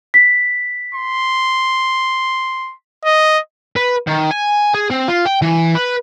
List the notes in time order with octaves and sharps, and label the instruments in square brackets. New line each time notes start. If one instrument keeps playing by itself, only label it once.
[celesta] B6
[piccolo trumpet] C6
D#5
[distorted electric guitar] B4
D#3
G#5
G#4
C4
F4
G5
E3
B4